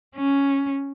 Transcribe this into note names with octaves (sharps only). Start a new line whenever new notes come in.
C#4